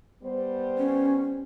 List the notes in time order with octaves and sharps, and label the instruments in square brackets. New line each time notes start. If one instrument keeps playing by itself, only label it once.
[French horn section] G3 B3 C5
[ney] C#4